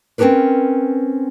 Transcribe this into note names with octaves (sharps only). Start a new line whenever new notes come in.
C4 C#4 D#4 G4 A#4 B4